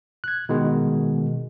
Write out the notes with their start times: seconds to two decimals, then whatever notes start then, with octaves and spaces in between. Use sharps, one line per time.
0.24 F#6 G#6
0.49 B2 D#3 G#3